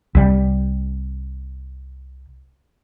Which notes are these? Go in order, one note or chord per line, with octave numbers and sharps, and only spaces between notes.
C2 G3